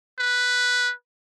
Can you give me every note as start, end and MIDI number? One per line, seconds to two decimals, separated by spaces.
0.19 0.92 71